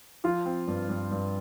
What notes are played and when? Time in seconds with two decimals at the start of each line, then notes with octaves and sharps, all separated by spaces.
0.24 F3 F4
0.46 C4
0.67 G2
0.89 G2
1.11 G2